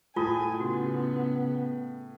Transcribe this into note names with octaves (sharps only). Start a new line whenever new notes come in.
A2 F4 G#5 A5 D#6
C#3 B3 F#4